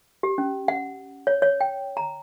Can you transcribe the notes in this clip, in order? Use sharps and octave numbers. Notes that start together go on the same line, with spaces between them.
G4
C#4
F#5
C#5
C#5
G5
A#5